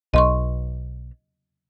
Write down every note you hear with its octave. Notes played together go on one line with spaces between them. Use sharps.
B1 D#5 C6 C#6